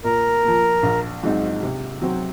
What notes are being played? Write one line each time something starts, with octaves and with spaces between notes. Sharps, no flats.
A#2 A#4
F3 A#3
A#1
G#2 F#3 C4 D#4
C3
F#3 C4 F#4